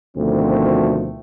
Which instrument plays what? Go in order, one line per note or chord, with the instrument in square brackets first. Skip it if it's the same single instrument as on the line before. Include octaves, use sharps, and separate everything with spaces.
[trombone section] D2 B2 D#3 F3 A3 C4